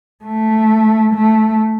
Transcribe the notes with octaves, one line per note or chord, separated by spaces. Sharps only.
A3
A3